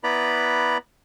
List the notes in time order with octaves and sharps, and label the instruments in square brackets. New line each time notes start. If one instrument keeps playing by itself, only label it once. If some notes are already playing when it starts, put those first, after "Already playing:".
[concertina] B3 E4 B4 D5 A#5 B5